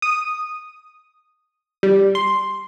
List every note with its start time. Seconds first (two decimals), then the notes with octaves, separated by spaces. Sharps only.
0.02 D#6
1.83 G3
2.15 C6